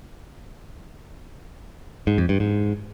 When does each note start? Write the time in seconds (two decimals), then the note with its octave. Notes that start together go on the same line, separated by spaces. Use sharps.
2.07 G#2
2.18 F2
2.29 G2
2.40 G#2